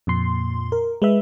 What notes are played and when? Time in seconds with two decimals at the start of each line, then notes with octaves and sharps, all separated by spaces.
0.07 F2 A#2 C6
0.72 A#4
1.02 G#3 B4 E5